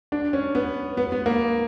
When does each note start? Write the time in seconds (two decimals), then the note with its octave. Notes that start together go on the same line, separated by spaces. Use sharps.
0.12 D4
0.33 C#4
0.55 B3
0.97 B3
1.12 B3
1.26 A#3